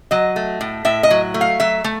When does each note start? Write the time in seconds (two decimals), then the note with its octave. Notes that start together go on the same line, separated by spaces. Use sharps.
0.11 F#3 D#5
0.36 A3
0.61 A2
0.85 A2 E5
1.03 D#5
1.11 F#3
1.34 A3
1.41 F5
1.60 F#3 E5
1.84 A3